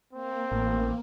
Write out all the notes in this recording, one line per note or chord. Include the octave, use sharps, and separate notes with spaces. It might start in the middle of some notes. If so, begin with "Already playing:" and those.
A#3 C4
A1